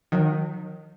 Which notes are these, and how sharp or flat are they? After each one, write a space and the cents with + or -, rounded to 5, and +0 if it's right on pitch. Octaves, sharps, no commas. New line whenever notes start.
D#3 +0 F#3 -35